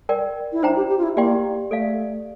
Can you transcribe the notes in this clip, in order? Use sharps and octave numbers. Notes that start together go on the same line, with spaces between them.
A#4 D5 G5
E4
D4 C5 G5 A#5
G4
G4
F4
E4
A#3 G4 D5 G5 C6
A3 A4 D5 F5